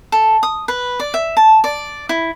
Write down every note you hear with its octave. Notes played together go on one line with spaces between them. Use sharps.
A4
D#6
B4
D5
E5
A5
D5
E4